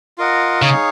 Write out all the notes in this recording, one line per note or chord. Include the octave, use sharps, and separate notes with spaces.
F4 A#4 D#5 F#5
C#3 D#4 G#4 C#5 F5